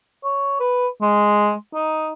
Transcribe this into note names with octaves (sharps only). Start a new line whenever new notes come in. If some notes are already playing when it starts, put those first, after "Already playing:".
C#5
B4
G#3
D#4